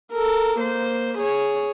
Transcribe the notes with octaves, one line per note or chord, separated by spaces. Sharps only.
A4 A#4
A#3 C5
G#4 C#5